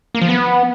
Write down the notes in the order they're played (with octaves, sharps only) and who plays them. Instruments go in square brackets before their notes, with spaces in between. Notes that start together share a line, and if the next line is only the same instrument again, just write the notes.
[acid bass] A#3
F3
B3